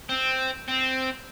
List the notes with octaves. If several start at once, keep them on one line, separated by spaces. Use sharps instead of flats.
C4
C4